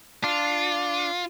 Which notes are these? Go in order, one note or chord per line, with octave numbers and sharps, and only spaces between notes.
D4 F4